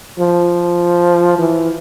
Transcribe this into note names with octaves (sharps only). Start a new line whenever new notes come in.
F3
E3